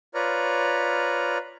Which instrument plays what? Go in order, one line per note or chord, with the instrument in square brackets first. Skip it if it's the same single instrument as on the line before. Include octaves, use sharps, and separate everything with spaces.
[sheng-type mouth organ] F4 B4 C#5 D5 A#5 F6